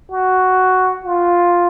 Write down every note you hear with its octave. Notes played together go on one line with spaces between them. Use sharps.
F#4
F4